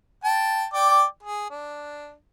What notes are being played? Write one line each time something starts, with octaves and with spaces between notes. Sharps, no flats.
G5 A5
D5 G5 D6
G#4
D4